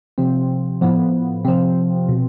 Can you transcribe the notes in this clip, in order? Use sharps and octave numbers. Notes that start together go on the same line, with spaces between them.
C3 F3 C4
A2 F3 B3
C3 F3 C4
B2